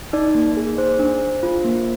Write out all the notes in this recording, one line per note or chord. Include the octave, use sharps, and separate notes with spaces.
D#4 D5
A#3
G#4
G#4 C5
D4
D4
F4
A#3